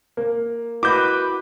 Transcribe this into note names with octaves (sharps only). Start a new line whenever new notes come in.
A#3
E4 F#4 B4 D#5 D6 G6